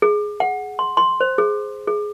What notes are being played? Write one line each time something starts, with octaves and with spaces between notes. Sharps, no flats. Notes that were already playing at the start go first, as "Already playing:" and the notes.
G#4
F#5
C6
C6
C5
G#4
G#4